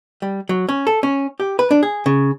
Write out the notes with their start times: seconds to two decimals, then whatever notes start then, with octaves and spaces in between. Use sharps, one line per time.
0.22 G3
0.49 F#3
0.69 C#4
0.87 A4
1.03 C#4
1.40 G4
1.59 B4
1.71 D4
1.83 G#4
2.06 C#3